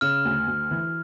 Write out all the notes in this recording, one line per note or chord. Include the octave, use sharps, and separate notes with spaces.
C#3 F6
D2
D2
E3